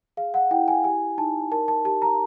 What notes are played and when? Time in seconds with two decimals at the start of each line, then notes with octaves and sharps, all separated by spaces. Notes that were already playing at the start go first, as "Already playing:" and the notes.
0.17 G#4 F5
0.34 F#5
0.51 E4 G5
0.68 G#5
0.84 G4 G#5
1.18 D#4 A5
1.51 A#4 A5
1.68 A5
1.85 G4 A5
2.02 A#5